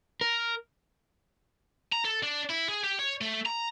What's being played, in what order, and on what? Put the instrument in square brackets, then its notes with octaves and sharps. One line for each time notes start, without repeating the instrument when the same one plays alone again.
[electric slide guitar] A#4
[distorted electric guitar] A#5
A4
D4
E4
G#4
G4
C#5
A3
A#5